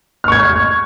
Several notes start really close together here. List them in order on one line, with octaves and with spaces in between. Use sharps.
F6 C#6 G#6